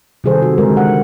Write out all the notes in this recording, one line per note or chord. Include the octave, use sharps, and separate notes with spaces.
C3 D#3 G3 G#4 A4 C5
F#4
D3 D#3 G#3 A#4
F#5